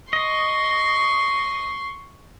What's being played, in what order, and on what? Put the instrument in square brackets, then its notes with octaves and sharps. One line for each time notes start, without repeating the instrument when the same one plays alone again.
[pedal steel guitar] D#5 [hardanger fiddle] C6 C#6